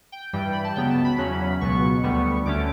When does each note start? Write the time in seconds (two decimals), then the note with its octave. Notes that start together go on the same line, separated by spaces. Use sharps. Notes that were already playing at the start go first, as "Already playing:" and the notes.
0.12 G5
0.33 G2 E3 G3 G5
0.53 B5
0.64 A5
0.76 C#2 C#3 F#3 B3 G5
0.90 A5
1.04 B5
1.18 E2 C#3 F#3 C#4
1.61 C#2 B2 F#3 B3 C#6
2.03 D2 D3 G3 B3
2.46 D2 D3 A3 C#4 D6